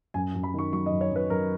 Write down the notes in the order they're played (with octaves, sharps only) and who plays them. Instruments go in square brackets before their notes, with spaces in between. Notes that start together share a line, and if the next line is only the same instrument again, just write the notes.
[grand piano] F#2 G#5
F#2
B5
D#3 C#6
F#3 C#6
D#5
F#2
C#5
F#2
B4
F#2 A#4